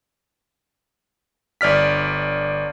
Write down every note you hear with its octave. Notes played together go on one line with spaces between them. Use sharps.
G1 D5 F6 B6